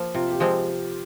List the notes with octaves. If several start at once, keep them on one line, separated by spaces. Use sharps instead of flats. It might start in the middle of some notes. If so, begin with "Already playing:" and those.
Already playing: F3 A#3
C3 F4
G4
F3 G#3 C4